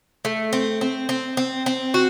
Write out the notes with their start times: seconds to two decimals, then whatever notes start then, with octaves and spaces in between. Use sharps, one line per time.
0.25 A3
0.53 C4
0.81 C4
1.09 C4
1.37 C4
1.66 C4
1.94 F#4